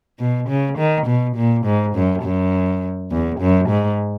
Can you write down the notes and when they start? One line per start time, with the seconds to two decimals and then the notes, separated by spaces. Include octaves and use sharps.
0.20 B2
0.49 C#3
0.78 D#3
1.06 B2
1.36 A#2
1.65 G#2
1.95 F#2
2.23 F#2
3.11 E2
3.40 F#2
3.69 G#2